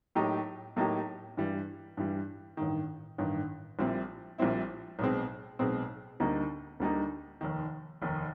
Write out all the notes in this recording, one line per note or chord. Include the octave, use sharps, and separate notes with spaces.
A2 F#3 A#3 D#4 G4
A2 F#3 A#3 D#4 G4
G2 E3 G3
G2 E3 G3
A1 G2 D#3
A1 G2 D#3
A#1 A#2 G3 C4 E4
A#1 A#2 G3 C4 E4
B1 B2 G#3 C4
B1 B2 G#3 C4
D2 D3 G3 A#3 D#4
D2 D3 G3 A#3 D#4
F1 D#2 D#3
F1 D#2 D#3